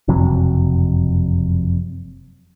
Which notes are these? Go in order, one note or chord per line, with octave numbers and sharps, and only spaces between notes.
F#1 F2 C3 F#3